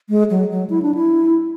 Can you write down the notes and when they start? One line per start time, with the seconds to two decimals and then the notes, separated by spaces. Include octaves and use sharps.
0.09 G#3
0.30 F#3
0.51 F#3
0.70 E4
0.82 D4
0.95 E4